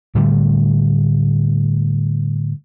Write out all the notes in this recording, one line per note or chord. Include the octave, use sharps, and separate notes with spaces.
A2 D3 G3 A3